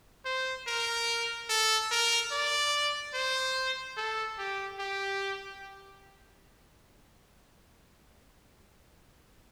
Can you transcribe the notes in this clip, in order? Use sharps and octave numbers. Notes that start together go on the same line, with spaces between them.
C5
A#4
A4
A#4
D5
C5
A4
G4
G4